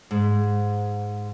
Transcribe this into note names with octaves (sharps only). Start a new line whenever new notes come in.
G#2